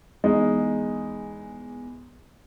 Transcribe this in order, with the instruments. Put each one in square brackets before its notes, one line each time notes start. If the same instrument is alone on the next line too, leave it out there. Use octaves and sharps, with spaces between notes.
[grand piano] E2 G#3 D#4